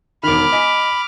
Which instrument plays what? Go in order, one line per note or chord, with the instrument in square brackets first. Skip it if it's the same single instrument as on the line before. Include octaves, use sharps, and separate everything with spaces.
[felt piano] E1 D#3 [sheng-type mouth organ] B5 [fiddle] D6 F6
[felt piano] D#5 G#5 B6